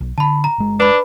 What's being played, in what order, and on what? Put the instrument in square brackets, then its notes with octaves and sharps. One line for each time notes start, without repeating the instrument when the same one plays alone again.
[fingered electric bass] B1
[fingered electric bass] D3 [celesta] A5 B5
[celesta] A#5
[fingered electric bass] G1 G#3
[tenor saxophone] D4 [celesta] B4 B5